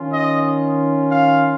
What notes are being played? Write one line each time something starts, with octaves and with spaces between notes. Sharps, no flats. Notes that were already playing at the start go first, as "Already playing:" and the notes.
Already playing: D#3 C#4 F4
D#5
F5